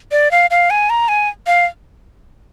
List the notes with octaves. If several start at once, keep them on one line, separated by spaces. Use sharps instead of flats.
D5
F5
F5
G#5
A#5
G#5
F5